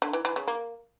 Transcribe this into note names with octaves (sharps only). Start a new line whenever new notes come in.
D3
E3
E3
C#3
A#3